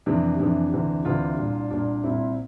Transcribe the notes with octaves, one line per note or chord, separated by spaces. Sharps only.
F2 C3 E3 D4
F2 C3 E3 D4
D2 C3 E3
D2 C3 E3 D4 F4
C2 A#2
C2 A#2 D4
C2 A#2 C4 E4